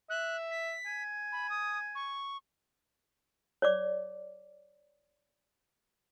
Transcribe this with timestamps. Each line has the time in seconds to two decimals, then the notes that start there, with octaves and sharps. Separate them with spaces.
0.10 E5 F#6
0.51 B6
0.86 G#5
1.32 B5
1.50 D#6
1.95 C#6
3.62 C#5 D5 D6